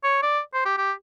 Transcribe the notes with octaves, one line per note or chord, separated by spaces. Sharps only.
C#5
D5
C5
G4
G4